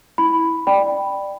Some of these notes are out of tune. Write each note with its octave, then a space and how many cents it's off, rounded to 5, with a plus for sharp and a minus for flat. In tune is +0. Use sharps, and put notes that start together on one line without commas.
E4 -10 B5 +5
D5 +15 G5 +0 B5 +0